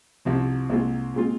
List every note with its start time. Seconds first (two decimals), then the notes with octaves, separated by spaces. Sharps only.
0.25 C2 C3 F3 C4
0.70 C2 A#2 G#3 C4 F4
1.14 A#2 G#3 C4 F4